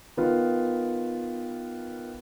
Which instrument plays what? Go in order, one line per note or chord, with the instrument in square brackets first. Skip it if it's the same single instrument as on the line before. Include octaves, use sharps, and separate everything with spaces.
[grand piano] D#3 B3 F4